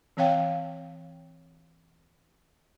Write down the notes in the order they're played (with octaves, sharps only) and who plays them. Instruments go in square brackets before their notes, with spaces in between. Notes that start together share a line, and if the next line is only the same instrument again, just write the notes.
[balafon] E3 C4 C#5 F5 G5